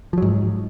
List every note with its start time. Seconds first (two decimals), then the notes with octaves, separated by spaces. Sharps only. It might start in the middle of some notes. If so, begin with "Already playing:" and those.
0.13 F3
0.18 F#3
0.22 G#2